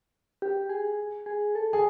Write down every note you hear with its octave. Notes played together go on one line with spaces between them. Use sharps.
G4
G#4
G#4
A4
G#4